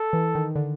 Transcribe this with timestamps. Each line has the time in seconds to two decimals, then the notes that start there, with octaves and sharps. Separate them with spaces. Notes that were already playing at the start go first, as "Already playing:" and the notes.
Already playing: A4
0.13 E3
0.35 D#3
0.56 D3